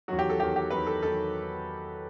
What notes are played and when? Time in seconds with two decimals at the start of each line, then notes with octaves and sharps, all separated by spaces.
0.08 E2 D#3 F#3 F#4
0.19 G4
0.30 A4
0.40 E2 D#3 F#3 G4
0.56 G4
0.70 E2 D#3 F#3 B4
0.87 A4
1.02 E2 D#3 F#3 A4